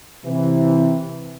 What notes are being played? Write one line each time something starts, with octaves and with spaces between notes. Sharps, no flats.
C3 E3